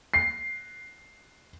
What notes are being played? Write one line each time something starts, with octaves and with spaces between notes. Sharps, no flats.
C7